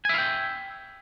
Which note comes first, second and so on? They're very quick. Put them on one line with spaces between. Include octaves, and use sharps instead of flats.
G#5 E5 F5 G5